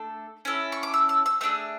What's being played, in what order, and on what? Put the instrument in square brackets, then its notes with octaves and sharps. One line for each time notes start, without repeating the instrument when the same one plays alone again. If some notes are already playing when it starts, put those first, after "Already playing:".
Already playing: [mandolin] A3 D4 A4
C#4 E4 A4
C#6
D6
E6
E6
E6
A3 D4 G#4 E6